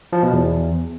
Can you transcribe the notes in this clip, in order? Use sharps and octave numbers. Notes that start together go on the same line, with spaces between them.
F3
B2
E2